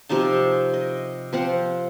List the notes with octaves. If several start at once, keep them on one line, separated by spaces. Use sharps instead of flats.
C3 F3 D#4 A5
D#5
F3 C4 F#5